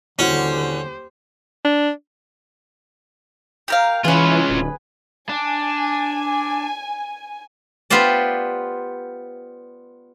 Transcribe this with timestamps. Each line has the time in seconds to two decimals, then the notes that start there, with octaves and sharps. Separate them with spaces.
0.19 D#1 D3 E3 C#4 F#4 G4 C5
1.65 D4
3.68 G4 A#4 F5
4.05 E3 C#4 F4 G#4 B4
4.50 D1
5.29 D4 G#5
7.90 B3 F4 G4 C5 D5